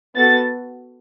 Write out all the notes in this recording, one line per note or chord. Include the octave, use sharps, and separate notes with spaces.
B3 F#4 A4 A6